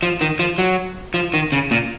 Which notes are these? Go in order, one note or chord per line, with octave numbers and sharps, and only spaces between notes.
F3
D#3
F3
F#3
F3
D#3
C#3
A#2